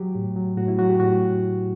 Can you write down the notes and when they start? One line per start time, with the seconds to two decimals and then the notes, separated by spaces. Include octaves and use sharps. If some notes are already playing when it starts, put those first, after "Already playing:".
Already playing: F#3 G4
0.15 A2
0.36 F#3
0.57 A2 F#4
0.68 E4
0.78 F#3 F#4
0.89 G4
0.99 A2 F#4